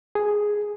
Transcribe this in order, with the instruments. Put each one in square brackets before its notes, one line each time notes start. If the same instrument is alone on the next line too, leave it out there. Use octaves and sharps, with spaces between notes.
[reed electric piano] G#4